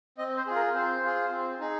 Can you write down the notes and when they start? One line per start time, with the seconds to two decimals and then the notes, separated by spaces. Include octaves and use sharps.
0.18 C4 D#5
0.37 C5
0.46 F4 G#4
0.56 A#4
0.75 C4 C5
1.03 F4 G#4
1.31 C4
1.60 D#4 G#4